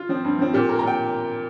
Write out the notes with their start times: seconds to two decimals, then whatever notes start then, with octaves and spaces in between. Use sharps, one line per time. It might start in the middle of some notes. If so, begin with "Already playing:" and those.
Already playing: F4
0.09 F3 C4
0.24 G2
0.39 F3 C4
0.53 A#2 G4
0.69 A#3 A#4
0.79 A#5
0.83 A#2 G5